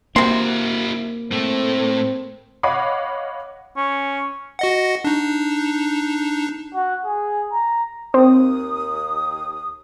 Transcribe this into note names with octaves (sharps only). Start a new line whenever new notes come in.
C3 A#3 E4 F#4 C6
A2 A3 C4
C#5 D#5 F5 F#5 B5 D6
C#4
F#4 D#5 F#5
D4 D#4
F#4
G#4
A#5
D#2 C4 D#6